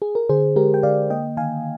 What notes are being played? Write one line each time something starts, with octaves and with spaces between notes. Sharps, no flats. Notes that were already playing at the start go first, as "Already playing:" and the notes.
G#4
A#4
D3 G#4 C5
G#3 G4 A#4
G5
D3 D5 F5
A#3 D#5 G5
D#3 F5 G#5